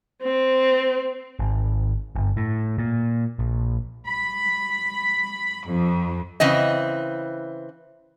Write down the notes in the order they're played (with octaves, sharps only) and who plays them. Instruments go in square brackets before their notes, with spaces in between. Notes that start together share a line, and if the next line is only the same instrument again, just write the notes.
[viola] C4
[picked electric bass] G#1
G1
A2
A#2
A#1
[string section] B5
F2
[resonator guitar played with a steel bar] C#3 E3 C4 D#5